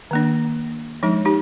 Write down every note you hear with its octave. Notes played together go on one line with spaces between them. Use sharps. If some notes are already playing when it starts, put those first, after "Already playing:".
D#3 A#3 D4
F3 G#3 D4 D#4
D#4 G4